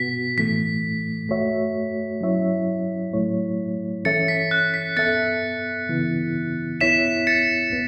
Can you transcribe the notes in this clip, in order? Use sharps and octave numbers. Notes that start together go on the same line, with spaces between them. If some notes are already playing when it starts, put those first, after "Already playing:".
Already playing: B2 B3 F#4 B6
A2 E3 A3 B6
A3 F#4 C#5 E5
F#3 C#4 E4 C#5 E5
A2 F#3 A3 E4 C#5
E3 C#4 A4 C#5 E5 A6 C#7
B6
F#6
B6
B3 A4 E5 A6 C#7
C#3 E3 B3 E4
B3 E4 C#5 E5 B6 E7
A6 C#7
B3